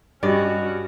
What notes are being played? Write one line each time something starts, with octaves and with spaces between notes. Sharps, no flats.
G2 C#4 F#4 D5 D#5